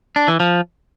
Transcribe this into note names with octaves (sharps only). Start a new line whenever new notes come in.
D4
E3
F3